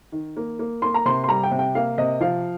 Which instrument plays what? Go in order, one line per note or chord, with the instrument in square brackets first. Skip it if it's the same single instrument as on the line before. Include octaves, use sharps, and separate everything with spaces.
[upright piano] D#3
A#3
A#3
A#3 C6
A#5
C3 C6
C6
G3 A#5
G5
C3
G5
A#3 F5
C3 D#5
F3 F5